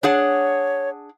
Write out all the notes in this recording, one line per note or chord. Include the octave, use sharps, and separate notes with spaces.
D4 G#4 C#5 F#5